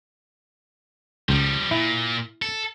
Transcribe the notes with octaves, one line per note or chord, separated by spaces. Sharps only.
C#2 F3 G3
A#2 E4
A4